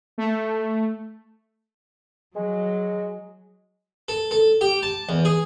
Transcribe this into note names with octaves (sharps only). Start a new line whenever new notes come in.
A3
F#3 G#3
A4
A4
G4
A5
E2
G#4